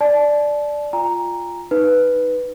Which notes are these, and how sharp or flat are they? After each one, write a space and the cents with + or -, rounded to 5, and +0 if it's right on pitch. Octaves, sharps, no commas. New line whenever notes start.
D5 +0 A5 -30
F4 +0 G5 +35 A#5 +0
D#4 +0 B4 +0